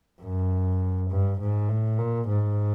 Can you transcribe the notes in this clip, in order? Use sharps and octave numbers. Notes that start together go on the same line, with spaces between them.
F#2
G2
G#2
A2
A#2
G#2